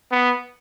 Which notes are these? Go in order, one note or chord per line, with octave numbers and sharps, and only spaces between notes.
B3